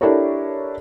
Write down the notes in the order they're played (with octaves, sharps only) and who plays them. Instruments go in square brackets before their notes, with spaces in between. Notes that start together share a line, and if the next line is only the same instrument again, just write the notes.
[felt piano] D4 E4 G4 A4 A#4 C#5